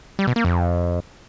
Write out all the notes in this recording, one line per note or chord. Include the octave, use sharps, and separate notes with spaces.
G3
B2
A#3
F2